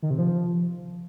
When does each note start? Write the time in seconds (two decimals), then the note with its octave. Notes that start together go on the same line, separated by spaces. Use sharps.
0.03 D#3
0.10 C3
0.18 F3